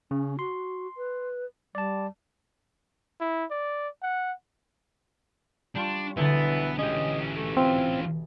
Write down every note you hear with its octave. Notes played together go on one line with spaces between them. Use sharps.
C#3 C#4
F#4 C6
B4
G3 D5 A5
E4
D5
F#5
G3 D4 F4 C#6
B1 D3 E3 B3 A6
E3 G#3 C#4 G4 D#5
A3
C4 F4